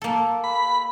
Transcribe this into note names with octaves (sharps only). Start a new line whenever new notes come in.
A#3 A4
B5